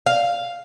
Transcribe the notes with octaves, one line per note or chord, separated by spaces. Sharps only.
F5